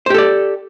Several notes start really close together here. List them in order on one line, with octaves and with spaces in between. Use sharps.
C5 G4 A4 D5